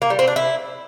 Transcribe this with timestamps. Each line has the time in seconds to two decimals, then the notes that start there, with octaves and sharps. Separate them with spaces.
0.02 A#3
0.10 G3
0.19 C4
0.27 D4
0.36 E4